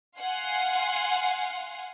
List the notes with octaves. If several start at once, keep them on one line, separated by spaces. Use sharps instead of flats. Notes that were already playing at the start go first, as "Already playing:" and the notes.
F5 F#5 G#5 C6